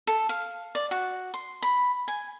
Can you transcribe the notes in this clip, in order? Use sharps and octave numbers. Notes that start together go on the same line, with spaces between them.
A4
F5
D5
F#4
C6
B5
G#5